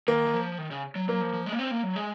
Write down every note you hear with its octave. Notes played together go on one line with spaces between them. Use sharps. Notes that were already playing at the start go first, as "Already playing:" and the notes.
D#3 A#3
D#3
F3
D#3
C#3
F#3
F#3 A#3
F3
F3
G#3
A#3
C4
A#3
F#3
G#3